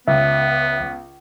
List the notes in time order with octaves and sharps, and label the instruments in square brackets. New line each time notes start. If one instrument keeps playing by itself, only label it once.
[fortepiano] C#2 [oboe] B3 [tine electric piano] E5